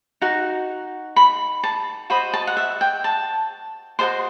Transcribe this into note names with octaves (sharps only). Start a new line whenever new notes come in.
D#4 F#4
B5
A5
F#4 C5 D#5 B5
A5
F#5
E5
G5
A5
F#4 A4 C5 D#5 C6